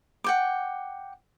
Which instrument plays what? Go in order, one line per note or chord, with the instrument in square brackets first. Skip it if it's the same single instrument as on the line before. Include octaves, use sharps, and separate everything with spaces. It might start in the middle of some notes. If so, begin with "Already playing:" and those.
[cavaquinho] F#5 G5 D6